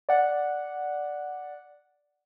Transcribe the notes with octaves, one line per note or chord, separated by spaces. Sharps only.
D5 F#5